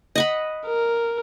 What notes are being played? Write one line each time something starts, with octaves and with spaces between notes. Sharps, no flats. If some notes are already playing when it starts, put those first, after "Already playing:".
D#5 F#5 B5
A#4